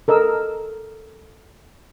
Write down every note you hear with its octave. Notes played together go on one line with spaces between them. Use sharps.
A4 A#4 D#5 E6